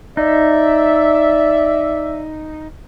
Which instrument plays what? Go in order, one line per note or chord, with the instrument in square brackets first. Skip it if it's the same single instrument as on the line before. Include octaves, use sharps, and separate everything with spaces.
[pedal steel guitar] D#4 [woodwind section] D5 E5